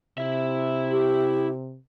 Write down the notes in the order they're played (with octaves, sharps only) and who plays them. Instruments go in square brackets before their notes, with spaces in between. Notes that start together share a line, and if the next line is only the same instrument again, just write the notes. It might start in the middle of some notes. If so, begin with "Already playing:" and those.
[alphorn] C3 [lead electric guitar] E4 E5
[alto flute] G4